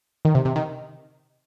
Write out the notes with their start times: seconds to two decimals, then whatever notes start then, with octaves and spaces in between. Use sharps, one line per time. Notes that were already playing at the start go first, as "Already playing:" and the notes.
0.25 D#3
0.35 C3
0.45 C3
0.56 D#3